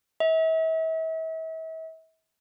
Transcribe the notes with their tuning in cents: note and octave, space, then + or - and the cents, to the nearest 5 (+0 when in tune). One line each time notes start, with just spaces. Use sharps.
E5 -40